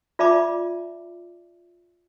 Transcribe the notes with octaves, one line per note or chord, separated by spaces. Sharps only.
F4 D5 E5 A5 B5 D6